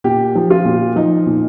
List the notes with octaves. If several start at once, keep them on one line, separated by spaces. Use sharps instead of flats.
A#2 G4
F3
F4
A#2
F3 D#4
A#2